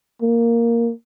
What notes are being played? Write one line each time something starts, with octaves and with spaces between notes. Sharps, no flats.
A#3